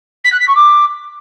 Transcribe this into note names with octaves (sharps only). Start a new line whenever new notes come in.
B6
F#6
B6
C#6
D6